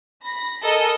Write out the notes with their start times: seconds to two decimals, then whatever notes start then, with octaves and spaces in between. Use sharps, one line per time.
0.24 B5 A#6
0.62 A4 A#4 D#5 G#5